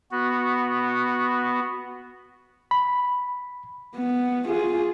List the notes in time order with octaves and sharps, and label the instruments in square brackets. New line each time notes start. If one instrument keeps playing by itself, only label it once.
[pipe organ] B3 F#4
[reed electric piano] B5
[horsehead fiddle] B3
F4 G#4